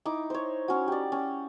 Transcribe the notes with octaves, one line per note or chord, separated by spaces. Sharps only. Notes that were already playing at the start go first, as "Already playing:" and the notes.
D#4 E4 D6
C5 C#5
C#4 F#4
G4 D5
C#4